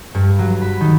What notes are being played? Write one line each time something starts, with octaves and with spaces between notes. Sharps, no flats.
G2
F#3
B5
D#3